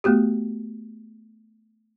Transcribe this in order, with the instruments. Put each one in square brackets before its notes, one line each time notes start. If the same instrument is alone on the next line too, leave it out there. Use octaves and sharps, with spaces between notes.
[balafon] A3 B3 F#4 G4